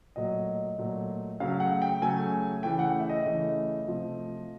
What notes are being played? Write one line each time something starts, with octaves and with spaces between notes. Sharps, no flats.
A#2 F#3 A3 D#5
A#2 F#3 A3
C#3 F#3 A3 F5
F#5
G5
C#3 F#3 A3 G#5
C#3 E3 A3 G5
F#5
E5
D#5
C#3 E3 A3
C3 F3 A3